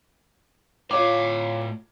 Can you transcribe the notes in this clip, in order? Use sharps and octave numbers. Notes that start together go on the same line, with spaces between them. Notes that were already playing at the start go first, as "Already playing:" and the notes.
A2 F4 C#5 F5 D6